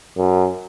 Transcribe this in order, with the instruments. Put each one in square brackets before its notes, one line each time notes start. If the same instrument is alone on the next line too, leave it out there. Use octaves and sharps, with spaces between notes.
[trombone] F#2